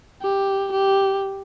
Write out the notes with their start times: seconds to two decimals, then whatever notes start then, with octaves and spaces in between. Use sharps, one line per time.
0.22 G4
0.72 G4